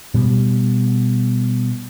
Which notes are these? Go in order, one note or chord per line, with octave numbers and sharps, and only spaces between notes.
B2 G3